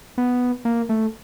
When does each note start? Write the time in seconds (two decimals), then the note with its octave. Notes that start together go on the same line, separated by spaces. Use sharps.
0.18 B3
0.65 A#3
0.89 A3